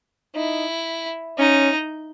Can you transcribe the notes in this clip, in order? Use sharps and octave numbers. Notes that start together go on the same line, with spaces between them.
D#4 E4
C#4 D#4